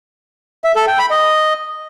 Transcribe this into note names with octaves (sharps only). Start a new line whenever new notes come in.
E5
A4
G5
B5
D#5